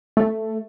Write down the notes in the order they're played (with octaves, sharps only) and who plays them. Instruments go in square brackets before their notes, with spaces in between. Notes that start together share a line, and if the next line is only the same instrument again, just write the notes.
[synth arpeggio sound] A3